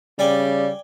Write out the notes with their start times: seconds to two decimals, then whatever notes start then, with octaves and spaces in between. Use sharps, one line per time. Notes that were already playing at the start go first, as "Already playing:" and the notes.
0.19 C#3 G3 D5 G5 G#5